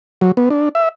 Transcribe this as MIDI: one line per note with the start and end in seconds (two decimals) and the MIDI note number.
0.21 0.32 54
0.37 0.49 59
0.50 0.69 62
0.75 0.89 76